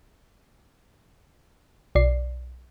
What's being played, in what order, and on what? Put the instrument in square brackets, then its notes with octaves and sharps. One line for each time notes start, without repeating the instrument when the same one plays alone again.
[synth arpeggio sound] B1 D5 C7